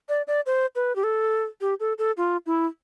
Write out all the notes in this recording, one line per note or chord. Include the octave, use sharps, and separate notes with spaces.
D5
D5
C5
B4
G4
A4
G4
A4
A4
F4
E4